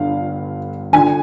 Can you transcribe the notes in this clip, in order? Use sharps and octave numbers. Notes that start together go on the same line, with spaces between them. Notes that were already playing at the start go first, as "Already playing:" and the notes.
Already playing: G1 G2 D3 F5
D3 G#5